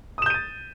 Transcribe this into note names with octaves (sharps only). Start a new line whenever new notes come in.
D#6 G6 A6 D#7 E7